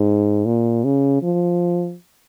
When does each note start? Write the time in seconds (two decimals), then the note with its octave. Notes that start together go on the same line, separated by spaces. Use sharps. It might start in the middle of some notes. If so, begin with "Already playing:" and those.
Already playing: G#2
0.46 A#2
0.84 C#3
1.22 F3